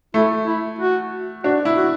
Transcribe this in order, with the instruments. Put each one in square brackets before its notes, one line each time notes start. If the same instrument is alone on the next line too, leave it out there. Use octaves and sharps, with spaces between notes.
[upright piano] A3 [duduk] E4
[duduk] E4
F#4
[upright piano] D4 [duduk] F#4
[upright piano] E4
[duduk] F#4